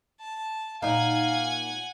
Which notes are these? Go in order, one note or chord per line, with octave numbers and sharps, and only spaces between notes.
A5
A#2 D#4 F5 F#5 G#5